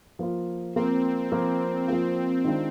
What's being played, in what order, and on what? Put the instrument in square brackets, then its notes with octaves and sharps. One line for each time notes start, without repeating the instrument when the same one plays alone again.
[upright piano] F3 A#3 F4
[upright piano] F3 A#3 F4 [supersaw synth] C4
[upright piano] F3 A#3 F4
[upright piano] F3 A#3 F4 [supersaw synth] C4
[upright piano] D#3 G#3 D4 F4